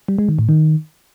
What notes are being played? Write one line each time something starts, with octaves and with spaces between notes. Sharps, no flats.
G3
G#3
D#3
A2
D#3